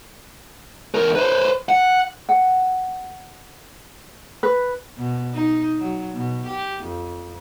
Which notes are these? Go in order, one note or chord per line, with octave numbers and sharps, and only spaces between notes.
E2 A#4
B4 C5
F#5
F#5
B4
B2
D#4
F#3
B2
G4
F2